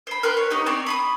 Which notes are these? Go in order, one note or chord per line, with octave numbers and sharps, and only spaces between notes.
C5 B5
A#4 B4 G5 C6
C#5
B3 C#4 D#4 G4
C4 G4 C#5 D5
B5 C6 D#6